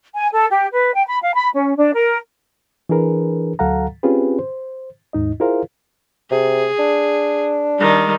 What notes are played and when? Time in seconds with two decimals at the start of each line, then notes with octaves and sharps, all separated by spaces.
0.15 G#5
0.33 A4
0.51 G4
0.73 B4
0.94 G5
1.06 B5
1.22 F5
1.35 B5
1.53 C#4
1.76 D4
1.94 A#4
2.89 E3 D4 G#4 A#4 B4
3.59 D2 F#3 A4 F5 F#5 A#5
4.03 C4 C#4 F4 G4 G#4 B4
4.39 C5
5.13 D#2 G#2 D#4 D#5
5.40 E4 F4 G#4 A#4 C5 F5
6.31 C3 G#4
6.79 D4
7.79 D#3 G3